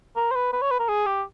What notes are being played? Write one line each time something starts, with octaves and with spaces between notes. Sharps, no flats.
A#4
C5
B4
B4
C#5
B4
A#4
G#4
G4